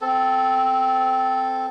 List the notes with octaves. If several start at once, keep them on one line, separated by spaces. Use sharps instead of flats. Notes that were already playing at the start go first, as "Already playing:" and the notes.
C4 A4